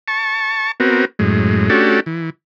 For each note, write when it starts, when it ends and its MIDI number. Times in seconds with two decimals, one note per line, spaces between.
0.08 0.72 81
0.08 0.72 85
0.80 1.05 59
0.80 1.05 60
0.80 1.05 66
0.80 1.05 70
1.19 1.69 42
1.19 1.69 45
1.19 1.69 56
1.70 2.00 57
1.70 2.00 61
1.70 2.00 62
1.70 2.00 66
1.70 2.00 67
1.70 2.00 69
2.06 2.30 52